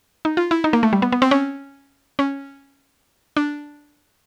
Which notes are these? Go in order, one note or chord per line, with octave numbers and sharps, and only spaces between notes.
D#4
F4
E4
D#4
A#3
A3
G3
B3
B3
C4
C#4
C#4
D4